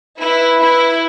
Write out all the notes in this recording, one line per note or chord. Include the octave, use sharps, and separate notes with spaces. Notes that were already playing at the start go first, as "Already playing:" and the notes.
E4 B4
E4